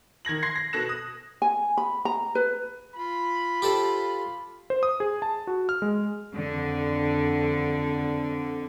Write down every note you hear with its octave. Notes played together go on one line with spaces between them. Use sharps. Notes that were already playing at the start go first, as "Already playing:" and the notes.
D#3 G#6 A#6 F#7
C6 G#6 A#6 C7
A#6
B2 A4 F#6 A#6 E7
D#6
G#5
B5
A#5
B4
F4 B5
G4 A4 C5
C5
D#6
G#4
A5
F#4
F6
G#3
F2 D3